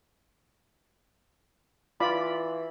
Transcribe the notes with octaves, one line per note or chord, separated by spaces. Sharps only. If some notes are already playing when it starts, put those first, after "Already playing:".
E3 F4 D5 B5